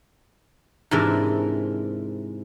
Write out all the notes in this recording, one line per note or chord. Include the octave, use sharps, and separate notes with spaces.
G#2 C3 E3 D4 A#4 E5